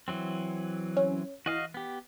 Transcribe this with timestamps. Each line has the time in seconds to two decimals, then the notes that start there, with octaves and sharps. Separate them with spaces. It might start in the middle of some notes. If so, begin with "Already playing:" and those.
0.08 E3 F#3 C4
0.97 C#4
1.46 E3 F#4 D#5 F5
1.74 B3 G4